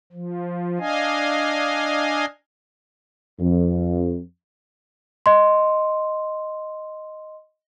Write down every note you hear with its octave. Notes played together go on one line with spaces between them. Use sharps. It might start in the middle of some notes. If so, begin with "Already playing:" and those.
F3
D4 D#5 F5 G#5
F2
D#5 C6